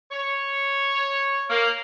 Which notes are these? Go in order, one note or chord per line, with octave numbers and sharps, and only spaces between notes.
C#5
A#3